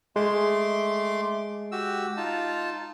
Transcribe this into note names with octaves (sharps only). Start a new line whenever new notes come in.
G#3 A3 C6 D6
F#4 G4 E6
D#4 F4 A5